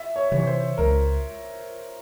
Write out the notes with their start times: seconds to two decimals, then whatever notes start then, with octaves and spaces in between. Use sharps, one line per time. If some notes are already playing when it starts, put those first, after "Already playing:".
Already playing: E5
0.16 C#5
0.32 C3 E3 C#5
0.47 C5
0.78 C#2 A#4